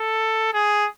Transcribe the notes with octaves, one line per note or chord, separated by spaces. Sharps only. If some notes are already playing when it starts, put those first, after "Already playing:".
Already playing: A4
G#4